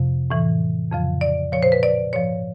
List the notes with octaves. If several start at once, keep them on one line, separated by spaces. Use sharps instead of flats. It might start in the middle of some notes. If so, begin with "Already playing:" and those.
Already playing: F2 C3 F3
A2 E3
F2 C#3 F3
D5
A#2 F3 C#5
C5
B4
D5
G#2 F3 C#5